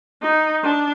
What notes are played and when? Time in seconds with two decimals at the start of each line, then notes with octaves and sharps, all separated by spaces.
0.22 D#4
0.63 D4